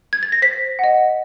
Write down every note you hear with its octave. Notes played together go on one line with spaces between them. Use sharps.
G#6
A6
A#6
C5 B6
D#5 F#5